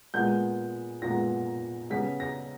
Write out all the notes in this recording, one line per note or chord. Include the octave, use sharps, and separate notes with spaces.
A#2 G#3 B3 G6
A#2 G#3 B3 A#6
C#3 G3 B3 B6
A#6